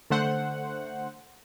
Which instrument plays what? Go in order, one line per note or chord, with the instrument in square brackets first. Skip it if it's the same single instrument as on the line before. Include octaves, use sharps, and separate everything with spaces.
[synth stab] D3 A3 C5 F#5